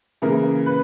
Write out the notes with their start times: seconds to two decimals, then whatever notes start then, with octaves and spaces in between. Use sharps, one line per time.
0.22 C#3 E3 A#3 A#4
0.66 B4